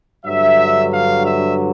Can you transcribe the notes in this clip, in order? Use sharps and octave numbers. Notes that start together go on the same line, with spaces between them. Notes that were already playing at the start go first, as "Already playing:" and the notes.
G2 D3 F#3 E5
F5
E5